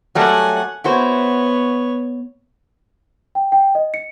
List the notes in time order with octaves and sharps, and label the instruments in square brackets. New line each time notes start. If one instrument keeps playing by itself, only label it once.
[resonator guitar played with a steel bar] F#3 G3 A3 [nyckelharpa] F#5 G#5
[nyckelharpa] B3 C#5 [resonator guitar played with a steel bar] E4 F#4 C5
[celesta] G5
G5
D#5
C#7